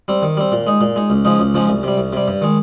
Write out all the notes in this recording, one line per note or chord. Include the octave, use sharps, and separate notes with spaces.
G3 C4
D#3
G3 C4
A#2
G#3 D#4
A#2
G#3 D#4
C#2
C#3 F3 G#3 D#4
C#2
C#3 F3 G#3 D#4
C2
C3 G3
C2
C3 G3
G2
D#3 G#3